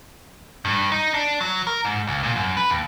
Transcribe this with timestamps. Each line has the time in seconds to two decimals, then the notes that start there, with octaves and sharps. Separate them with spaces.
0.65 G2
0.92 D#4
1.14 D4
1.41 F#3
1.67 A#4
1.85 G#2
2.07 C#2
2.23 A#2
2.36 F#2
2.57 B4
2.70 D#2